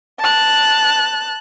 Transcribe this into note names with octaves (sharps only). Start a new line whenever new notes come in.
A5 F#6